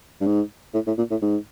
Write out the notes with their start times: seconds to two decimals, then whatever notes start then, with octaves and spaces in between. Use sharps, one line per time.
0.21 G2
0.26 G#2
0.74 A2
0.87 A2
0.98 A#2
1.11 A2
1.22 G#2